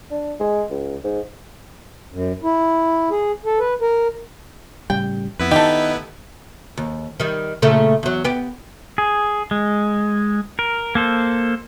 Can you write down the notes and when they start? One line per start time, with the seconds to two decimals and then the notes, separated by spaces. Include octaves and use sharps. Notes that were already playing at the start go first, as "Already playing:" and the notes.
0.11 D4
0.40 G#3
0.70 C#2
1.04 G#2
2.12 F#2
2.43 E4
3.11 G#4
3.45 A4
3.60 B4
3.81 A#4
4.90 A2 C#3 G3 G5
5.39 F2 B3 E4 B4
5.51 D#3 D4 D#4 G4 A4
6.77 D#2
7.20 D#3 G3
7.62 A#2 C#3 A3
8.03 E2 F#3
8.24 B3 G4
8.98 G#4
9.51 G#3
10.59 A#4
10.95 A#3 A4 C5